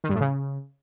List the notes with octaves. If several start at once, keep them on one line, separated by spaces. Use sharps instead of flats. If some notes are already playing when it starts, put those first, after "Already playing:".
D#3
G2
A2
C#3